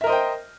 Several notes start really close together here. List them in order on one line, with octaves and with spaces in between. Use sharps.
E5 A#4 D#5 C5 G5